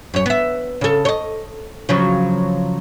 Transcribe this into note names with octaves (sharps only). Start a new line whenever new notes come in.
F#2 C#5
B3 E5
C#3 A4
C#5 D#5
C#3 F3 F#3